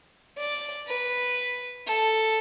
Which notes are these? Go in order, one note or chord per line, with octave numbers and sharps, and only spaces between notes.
D5
B4
A4